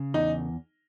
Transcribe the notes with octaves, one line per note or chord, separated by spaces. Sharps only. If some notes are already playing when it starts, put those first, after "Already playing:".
Already playing: C#3
E2 D#4